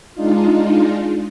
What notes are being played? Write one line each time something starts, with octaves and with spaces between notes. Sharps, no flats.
G#3 D4 D#4 F4